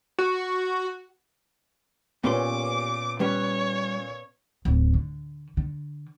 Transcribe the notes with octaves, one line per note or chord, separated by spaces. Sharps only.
F#4
A#2 A#3 B3 C#4 G4 C6 D6
G3 C#4 B4 C#5
D1
D3
D3